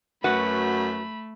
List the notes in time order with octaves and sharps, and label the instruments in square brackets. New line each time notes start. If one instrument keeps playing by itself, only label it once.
[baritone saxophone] F#2 [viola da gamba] A3 [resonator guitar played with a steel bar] F#4 B4 F#5 [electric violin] B5